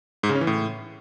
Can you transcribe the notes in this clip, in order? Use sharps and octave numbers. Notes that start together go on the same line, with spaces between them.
G#2
C#3
C#4
E3
A2